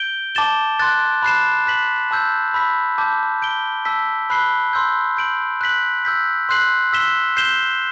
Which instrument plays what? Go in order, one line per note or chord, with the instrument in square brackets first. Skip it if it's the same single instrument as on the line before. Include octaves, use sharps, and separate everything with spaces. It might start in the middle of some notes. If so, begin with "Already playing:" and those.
Already playing: [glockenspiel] G6 D7 G7
A5 D6 A6 E7 G7
C6 F#6 A6
B5 F#6 C7 E7
F#6 B6 F#7
A5 E6 G6
B5 E6 B6
A5 D6 G6
G6 D7 G7
A5 E6 B6
B5 F#6 C7 G7
C6 E6 G6
G6 D7 F#7
F#6 B6 F#7
E6 G6 B6
C6 F#6 C7 F#7
E6 B6 E7 G7
G6 C7 E7 G7